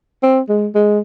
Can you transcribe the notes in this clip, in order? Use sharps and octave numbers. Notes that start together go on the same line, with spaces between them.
C4
G#3
G#3